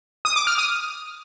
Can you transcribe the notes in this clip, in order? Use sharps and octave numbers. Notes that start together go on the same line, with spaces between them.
D#6
D6
F6
D#6